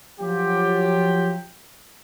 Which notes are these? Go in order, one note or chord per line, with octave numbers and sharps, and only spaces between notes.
F3 F#3 F4 G4